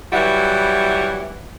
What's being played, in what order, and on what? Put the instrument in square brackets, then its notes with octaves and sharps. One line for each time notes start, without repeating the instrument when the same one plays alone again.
[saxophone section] E3 F#3 G3 E4 F#4